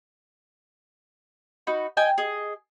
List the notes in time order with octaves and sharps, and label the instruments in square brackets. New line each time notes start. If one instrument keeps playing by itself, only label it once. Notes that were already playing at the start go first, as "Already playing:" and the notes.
[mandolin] D#4 F#4 B5
D#5 G5 G#5
G#4 D#5